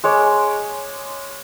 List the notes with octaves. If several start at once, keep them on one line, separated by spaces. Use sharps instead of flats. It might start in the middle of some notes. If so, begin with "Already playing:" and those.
G#3 C#5 D6